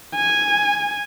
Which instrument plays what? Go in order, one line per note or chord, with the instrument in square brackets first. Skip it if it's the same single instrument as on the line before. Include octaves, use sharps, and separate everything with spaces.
[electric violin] G#5